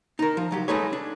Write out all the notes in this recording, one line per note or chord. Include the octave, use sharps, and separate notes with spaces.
D#4 A#4
F3
C#2 F#3 G4
G#3 A3 D#4 G#4 B4 C#5
D4